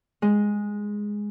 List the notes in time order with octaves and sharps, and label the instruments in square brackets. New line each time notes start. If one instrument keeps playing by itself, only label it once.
[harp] G#3